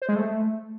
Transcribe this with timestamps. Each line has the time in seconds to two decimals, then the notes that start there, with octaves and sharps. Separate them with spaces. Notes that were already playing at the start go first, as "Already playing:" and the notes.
0.02 C5
0.09 G#3
0.16 A3